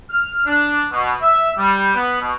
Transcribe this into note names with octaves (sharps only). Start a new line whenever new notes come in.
F6
D4
B2
E5
G3
B3
B2